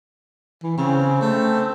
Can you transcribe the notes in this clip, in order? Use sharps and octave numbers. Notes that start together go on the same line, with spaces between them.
E3
C#3 C4
A3